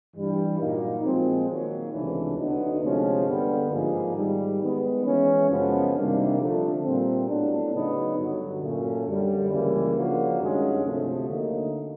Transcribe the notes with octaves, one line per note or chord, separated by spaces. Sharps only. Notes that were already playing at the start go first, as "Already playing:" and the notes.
G2 E3 G3
A#2 F#3 A#3 D#4
A#2 F3 G#3 C4
D#3 F#3 A#3
C#2 C3 E3 A3 D4
D2 D3 F#3 B3 D#4
D2 C3 F3 G#3 C#4
G2 D3 G3 B3
G#2 F3 A#3 D#4 G#4
G#2 D#3 G3
D#3 G#3 B3
E3 G#3 C#4
F#2 C#3 F3 G#3 B3
C3 D#3 G3 A#3 D4
D3 F3 A3 D4
A#2 G3 C4
A2 F#3 B3 D4
C#3 F#3 B3 D#4
G2 D3 F#3
A#2 F#3 A3 C#4
F#2 D3 G3
C#2 C#3 E3 G3 A#3
C#3 F3 A#3 D4 F#4
G2 D#3 G#3 C#4 F#4
D2 C3 F3 A3
D2 D3 F#3 A#3 D#4